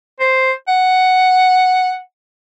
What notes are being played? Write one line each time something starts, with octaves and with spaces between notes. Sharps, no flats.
C5
F#5